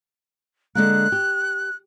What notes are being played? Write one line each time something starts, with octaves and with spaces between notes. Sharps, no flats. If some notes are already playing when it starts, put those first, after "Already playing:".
D3 G#3 A#3 F#6
G4